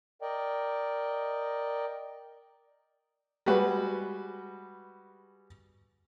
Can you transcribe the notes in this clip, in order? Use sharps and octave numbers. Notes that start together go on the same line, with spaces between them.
A#4 D5 D#5 G5
G3 G#3 F#4 B4